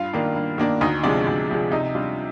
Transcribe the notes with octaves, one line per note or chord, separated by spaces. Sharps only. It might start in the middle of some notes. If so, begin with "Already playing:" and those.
Already playing: G2 F4 F5
D#3 A#3 D4
G2
D#3 A#3 D4
D2 D#4 D#5
C3 F3 G#3 D4 D5
D2
C3 F3 G#3
C3 D#4 D#5
G3 D4 F4